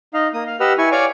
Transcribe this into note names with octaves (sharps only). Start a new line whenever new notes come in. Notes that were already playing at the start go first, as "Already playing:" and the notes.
D#4 D#5 F5
A#3 D#6
F5
G4 B4 D#5 F#5 E6 F6
E4 G#5 C#6
C#5 D5 F5 G#5 C#6 D6